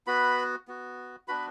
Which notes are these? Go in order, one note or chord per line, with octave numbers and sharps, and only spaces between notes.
B3 F#4 B4 B5
B3 F#4
B3 D4 F#4 B4 B5